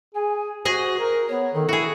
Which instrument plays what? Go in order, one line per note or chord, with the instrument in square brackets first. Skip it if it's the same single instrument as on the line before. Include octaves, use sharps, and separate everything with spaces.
[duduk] G#4 [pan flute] G#5
[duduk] F#4 [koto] G#4 D#5 G#5 [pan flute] C5
[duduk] A#4
[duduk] B3 [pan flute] C#5
[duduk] D#3 [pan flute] A4
[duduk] E4 [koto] F#4 G#4